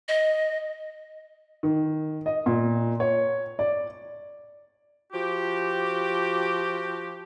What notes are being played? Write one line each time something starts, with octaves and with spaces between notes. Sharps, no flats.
D#5
D#3
D#5
A#2
C#5
D5
F3 F#4 G4